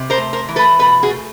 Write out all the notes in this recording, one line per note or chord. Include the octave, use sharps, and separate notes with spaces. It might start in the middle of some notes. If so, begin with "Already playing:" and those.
Already playing: C3
A#4 C5
A3
A#4 C5
E3
A4 B4
B2 A4 B4
F#4 G#4
A3